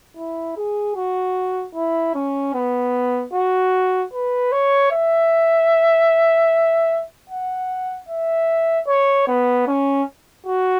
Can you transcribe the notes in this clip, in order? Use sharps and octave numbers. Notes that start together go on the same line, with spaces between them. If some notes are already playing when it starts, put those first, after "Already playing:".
E4
G#4
F#4
E4
C#4
B3
F#4
B4
C#5
E5
F#5
E5
C#5
B3
C#4
F#4